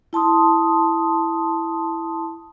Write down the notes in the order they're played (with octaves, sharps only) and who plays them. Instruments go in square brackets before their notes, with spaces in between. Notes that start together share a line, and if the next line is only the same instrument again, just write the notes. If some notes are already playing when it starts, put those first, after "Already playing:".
[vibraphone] E4 A5 C6 D#6